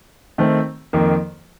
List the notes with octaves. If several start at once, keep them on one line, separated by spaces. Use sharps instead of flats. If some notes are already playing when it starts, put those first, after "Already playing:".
D#3 A3 C4
F2 D#3 A#3